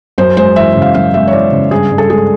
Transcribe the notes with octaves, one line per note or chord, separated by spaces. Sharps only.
F#2 C5
G#3 C5
E3 E5
C#3
F5
F#2 F5
G#3 E5
C#5
E3 D5
C#3
G2 G#4
G2
A4
G#3 G#4